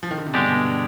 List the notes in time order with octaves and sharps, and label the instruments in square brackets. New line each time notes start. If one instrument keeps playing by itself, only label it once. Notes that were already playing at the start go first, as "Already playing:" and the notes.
[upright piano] F3
D#3
D3
C3
[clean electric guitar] G2 D3 G#3 D4 G4 [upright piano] B2
[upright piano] B2